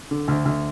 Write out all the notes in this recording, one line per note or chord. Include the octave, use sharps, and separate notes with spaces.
D3
D2
D2